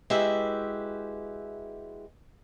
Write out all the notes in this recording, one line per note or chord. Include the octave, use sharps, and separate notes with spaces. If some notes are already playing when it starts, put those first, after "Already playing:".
G#3 E4 F#4 G4 B4 E5